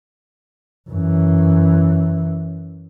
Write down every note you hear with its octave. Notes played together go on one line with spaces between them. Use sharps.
F#2 E3